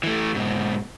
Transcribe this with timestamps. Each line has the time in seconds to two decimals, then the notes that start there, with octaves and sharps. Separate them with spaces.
0.03 E3 A3
0.35 G#2 B2